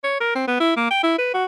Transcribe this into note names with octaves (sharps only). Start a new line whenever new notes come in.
C#5
A#4
C4
B3
E4
A#3
G5
E4
B4
F#4